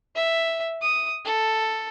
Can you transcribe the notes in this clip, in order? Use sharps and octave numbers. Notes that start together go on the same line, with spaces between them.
E5
D#6
A4